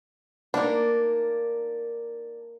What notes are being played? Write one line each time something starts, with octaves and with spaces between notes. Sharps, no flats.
A#3 D4 D#4 A#4